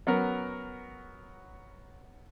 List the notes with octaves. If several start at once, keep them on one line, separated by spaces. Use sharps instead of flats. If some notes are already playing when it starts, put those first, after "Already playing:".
F#3 B3 C#4 A#4